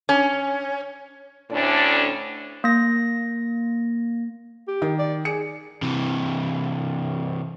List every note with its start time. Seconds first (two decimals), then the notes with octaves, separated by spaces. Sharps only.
0.09 C#4
1.51 D2 A2 C#4 D4 D5
2.64 A#3 A#6
4.68 G4
4.82 D#3
4.99 D5
5.25 G#4 C#7
5.82 C3 E3